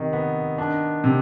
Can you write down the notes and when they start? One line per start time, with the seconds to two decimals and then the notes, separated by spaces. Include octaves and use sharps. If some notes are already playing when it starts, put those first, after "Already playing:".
Already playing: C3 D#3
0.13 B3
0.58 D4
1.04 C3